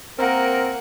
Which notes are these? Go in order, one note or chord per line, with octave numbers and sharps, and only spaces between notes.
A#3 C4 A#4 F#5